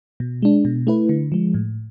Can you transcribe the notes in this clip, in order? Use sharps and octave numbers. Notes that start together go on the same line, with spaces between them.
B2
G#3 D4
B2
A3 E4 B4
D3
F3 G#3
A2